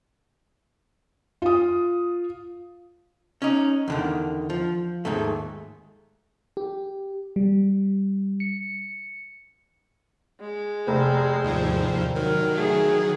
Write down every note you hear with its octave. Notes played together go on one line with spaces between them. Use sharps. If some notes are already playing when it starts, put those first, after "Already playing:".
F4 D#6
C#4 D#4
E2 D3 D#3
F3
D#2 G#2 D#3 A3
G4
G3
C#7
G#3
F1 C5
D#2 G#2 F3
D#3 F#3 A#4
A3 G#4